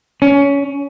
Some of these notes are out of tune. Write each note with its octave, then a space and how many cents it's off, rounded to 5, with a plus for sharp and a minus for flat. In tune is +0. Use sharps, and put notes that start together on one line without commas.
C#4 +20